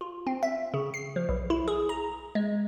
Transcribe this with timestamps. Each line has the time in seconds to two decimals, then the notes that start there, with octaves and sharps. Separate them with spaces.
0.01 F4
0.27 C4
0.43 E5
0.74 C#3
0.94 C7
1.16 F3
1.29 B1
1.50 E4
1.68 G#4
1.89 A#5
2.35 G#3